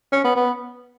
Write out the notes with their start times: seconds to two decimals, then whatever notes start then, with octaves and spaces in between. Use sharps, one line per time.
0.13 C#4
0.24 B3
0.36 B3